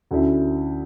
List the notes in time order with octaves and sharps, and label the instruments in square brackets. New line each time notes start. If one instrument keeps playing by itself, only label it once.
[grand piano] D2 D3 A3 C#4 E4